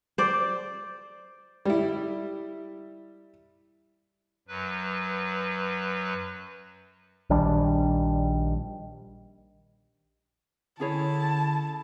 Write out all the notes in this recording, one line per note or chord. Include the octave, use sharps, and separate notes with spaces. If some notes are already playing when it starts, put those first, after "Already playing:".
C5 D5
G3 E4
F#2 F#3 B4
A#1 D#3 G3 D4
D3 C#4 E4 G#4 C#5 A5